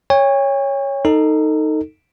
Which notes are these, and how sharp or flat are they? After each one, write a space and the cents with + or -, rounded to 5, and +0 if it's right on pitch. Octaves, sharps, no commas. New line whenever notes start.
C#5 +0 G5 +45
D#4 +0 A4 +25